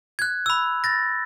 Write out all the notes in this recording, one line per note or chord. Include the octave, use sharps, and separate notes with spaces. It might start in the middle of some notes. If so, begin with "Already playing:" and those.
F#6 G#6
B5 E6
A6 A#6